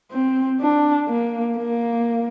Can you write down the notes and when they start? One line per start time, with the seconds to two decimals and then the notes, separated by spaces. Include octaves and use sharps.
0.11 C4
0.60 D4
1.08 A#3
1.57 A#3